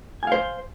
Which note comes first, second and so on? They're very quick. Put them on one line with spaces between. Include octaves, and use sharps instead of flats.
G#5 F5 C5